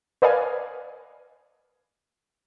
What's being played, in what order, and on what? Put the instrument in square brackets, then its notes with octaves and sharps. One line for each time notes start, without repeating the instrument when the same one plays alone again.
[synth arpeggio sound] A#4 B4 D5 D#5 F5 G#5